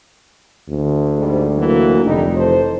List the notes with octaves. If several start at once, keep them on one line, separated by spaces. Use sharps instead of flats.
D2
G#2 G3
E3 F#3 A#3
F1 D3 G3 D#4
E3 A4 C5